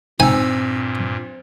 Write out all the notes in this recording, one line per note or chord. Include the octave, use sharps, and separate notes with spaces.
G2 A#2 C4 D#4 G#5 E6